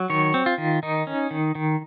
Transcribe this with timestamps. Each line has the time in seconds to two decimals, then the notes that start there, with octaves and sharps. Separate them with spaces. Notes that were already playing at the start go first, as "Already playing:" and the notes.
Already playing: F#3
0.10 D#3 C#5
0.34 C4
0.46 F4
0.58 D#3
0.83 D#3 D#4
1.07 C#4
1.31 D#3
1.55 D#3